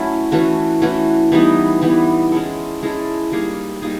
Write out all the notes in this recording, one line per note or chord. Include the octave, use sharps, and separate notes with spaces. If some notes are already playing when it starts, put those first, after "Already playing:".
Already playing: F#3 A3 C#4 E4
E3 A3 C#4 F#4
E3 A3 C#4 F#4
E3 G3 B3 D#4
E3 G3 B3 D#4
G#3 C#4 E4 A4
G#3 C#4 E4 A4
G3 A#3 D#4 G#4
G3 A#3 D#4 G#4